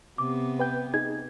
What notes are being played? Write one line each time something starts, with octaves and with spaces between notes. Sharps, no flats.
C3 B3 D6
B4 G5 G6
D#4 G#4 G#6